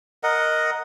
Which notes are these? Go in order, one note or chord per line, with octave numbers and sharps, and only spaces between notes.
A#4 D#5 F#5